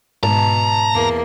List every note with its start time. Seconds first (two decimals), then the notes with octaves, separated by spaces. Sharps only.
0.23 G#2 B2 A5 A#5
0.94 E2 A#3